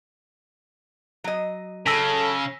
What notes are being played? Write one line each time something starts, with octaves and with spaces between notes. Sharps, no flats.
F#3 D#5
C#3 A4 E6 A#6 B6